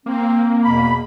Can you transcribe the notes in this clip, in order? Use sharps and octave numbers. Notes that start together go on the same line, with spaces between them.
A#3 C4
E2 B2 B5